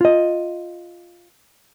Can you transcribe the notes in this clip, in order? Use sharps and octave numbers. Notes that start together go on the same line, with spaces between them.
F4 D#5